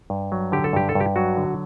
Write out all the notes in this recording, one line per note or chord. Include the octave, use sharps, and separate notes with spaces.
G2
F#3
D3 G4
A4
G2 G4
A4
G2 G4
F#3 F#4
D3